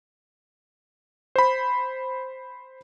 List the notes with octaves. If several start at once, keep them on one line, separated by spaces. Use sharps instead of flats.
C5 B5